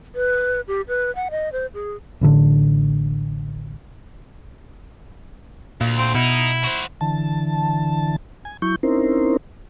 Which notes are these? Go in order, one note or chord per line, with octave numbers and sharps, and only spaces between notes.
B4
G4
B4
F#5
D#5
C5
G#4
A1 A2 D3
D2 A#2
C4
B2 D#4 E4
F#4 C5
D3 E3 A5
G#5
F#3 E4 C#6 G6
C4 C#4 D#4 E4 A#4 C5